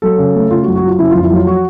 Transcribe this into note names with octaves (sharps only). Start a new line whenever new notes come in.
F#3 A4
C#3
A3
C#3 F4
F#4
F#2
F#4
F#3 F4
C#3 E4
F2 F4
E4
F#3 F4
F3 F#4